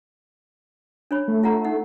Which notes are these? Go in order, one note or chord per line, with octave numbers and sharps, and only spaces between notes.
D4 C#5 B5
A3
F4 F#5 A#5
D#4 F#5